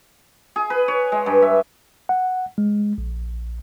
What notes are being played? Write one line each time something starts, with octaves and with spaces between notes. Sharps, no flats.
G#4
B4
C#5
G#3
G2
E5
F#5
G#3
A#1